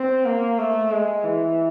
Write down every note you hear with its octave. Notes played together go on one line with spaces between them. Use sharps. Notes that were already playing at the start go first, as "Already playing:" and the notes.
Already playing: C4
A#3
A3
G#3
E3